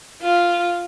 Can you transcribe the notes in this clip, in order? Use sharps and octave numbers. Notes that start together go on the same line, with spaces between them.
F4